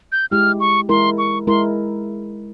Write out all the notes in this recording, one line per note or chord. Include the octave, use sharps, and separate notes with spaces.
G6
G#3 E4 G4 F6
C#6
G#3 E4 A#4 C6
C#6
G#3 E4 A#4 C6